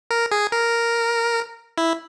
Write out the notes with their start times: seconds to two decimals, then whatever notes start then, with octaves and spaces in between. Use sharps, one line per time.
0.11 A#4
0.32 G#4
0.52 A#4
1.78 E4